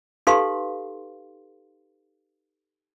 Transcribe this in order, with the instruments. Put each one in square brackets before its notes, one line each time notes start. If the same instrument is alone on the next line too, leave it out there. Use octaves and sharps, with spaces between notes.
[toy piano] D#4 G4 A4 B4 F5 C6